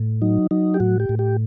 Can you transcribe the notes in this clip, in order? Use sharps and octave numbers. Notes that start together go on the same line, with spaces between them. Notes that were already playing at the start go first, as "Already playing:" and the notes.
Already playing: A2
F#3 D#4
F#3 D#4
G4
A2 F#4
G4
A2
G4